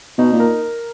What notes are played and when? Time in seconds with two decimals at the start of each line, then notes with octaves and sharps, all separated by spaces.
0.18 B2 D#4
0.32 A#2
0.40 A#4